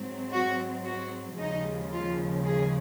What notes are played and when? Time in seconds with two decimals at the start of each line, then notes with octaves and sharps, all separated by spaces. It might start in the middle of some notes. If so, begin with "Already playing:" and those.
Already playing: G#2 F#3 C4
0.32 F#4
0.85 F#4
1.38 D#2 C#3 F3 G#3 D#4
1.92 F4
2.45 G#4